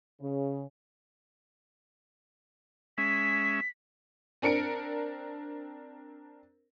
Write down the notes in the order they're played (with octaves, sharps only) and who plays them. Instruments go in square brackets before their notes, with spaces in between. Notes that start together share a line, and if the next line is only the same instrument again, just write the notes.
[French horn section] C#3
[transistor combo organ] G#3 C#4 E5 [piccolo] B6
[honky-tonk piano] C4 D4 A#4 C#7 D7